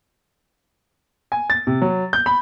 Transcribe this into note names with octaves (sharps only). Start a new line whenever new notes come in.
G#5
A6
C3
F#3
G6
B5